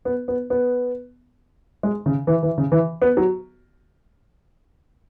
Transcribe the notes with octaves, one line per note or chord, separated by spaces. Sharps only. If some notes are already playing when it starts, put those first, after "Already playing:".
B3
B3
B3
G#3
C#3
E3
E3
C#3
E3
B3
F#3